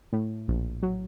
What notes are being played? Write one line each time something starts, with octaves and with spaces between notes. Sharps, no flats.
A2
A#1
F#3